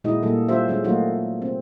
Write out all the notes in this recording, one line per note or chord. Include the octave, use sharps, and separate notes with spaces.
A#2 G#3 D#4 E4 F#4 D#5
A#2 G3 A#3 A4
G3 F4 G4 C5 E5
G3 G#3 C#4
F#3 A3 A#3 D#4 F4 F#4
C4